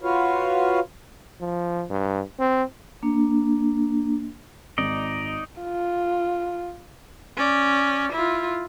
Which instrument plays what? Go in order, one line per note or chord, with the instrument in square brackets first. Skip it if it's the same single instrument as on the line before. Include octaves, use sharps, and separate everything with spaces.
[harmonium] F4 F#4 B4 C#5 F5
[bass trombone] F3
G2
C4
[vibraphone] A#3 D4
[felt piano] G#1 [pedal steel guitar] D#4 D5 D#5
[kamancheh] F4
[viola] C#4 D5
E4 F4